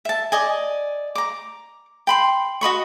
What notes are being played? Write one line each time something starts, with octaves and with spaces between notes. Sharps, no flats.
E5 A5
D5 D#5 G#5
A#5 D6
G5 B5 C6
F#4 D#5 B5 C#6